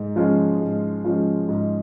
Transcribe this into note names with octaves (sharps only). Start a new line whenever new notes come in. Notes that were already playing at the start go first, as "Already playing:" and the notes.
Already playing: G#2
F3 G#3 C#4 F4
G#2
F3 G#3 C#4 F4
G#2